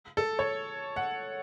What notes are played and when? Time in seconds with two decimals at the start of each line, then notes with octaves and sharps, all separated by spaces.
0.17 A4
0.39 C#5
0.96 F#5